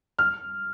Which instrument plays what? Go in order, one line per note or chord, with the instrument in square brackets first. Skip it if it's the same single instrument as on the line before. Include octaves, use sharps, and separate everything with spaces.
[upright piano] F6